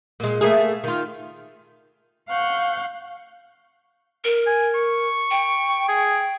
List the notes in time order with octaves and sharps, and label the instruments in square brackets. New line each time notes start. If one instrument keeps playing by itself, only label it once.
[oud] A#2 G#3
A3 A#3 G#4
D#3 F4
[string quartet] F5 F#5 C#6 G6
[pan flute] A#4
[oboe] G#5
C#6
[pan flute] G5
[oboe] G#4